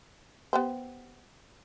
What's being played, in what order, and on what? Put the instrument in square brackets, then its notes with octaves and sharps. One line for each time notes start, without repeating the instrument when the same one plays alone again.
[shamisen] B3 G4 C5